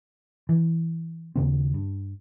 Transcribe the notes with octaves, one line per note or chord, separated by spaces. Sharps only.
E3
D#2 C#3 C4
G2